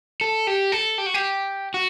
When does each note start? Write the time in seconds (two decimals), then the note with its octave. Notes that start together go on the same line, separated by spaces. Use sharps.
0.21 A4
0.47 G4
0.72 A4
0.98 G4
1.06 F#4
1.14 G4
1.74 F#4